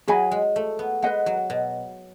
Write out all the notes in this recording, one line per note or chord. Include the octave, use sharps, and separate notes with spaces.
F#3 G#4 D#5 G#5 B5
G#3
A3
B3
G#3 B4 D#5 F#5
F#3
B2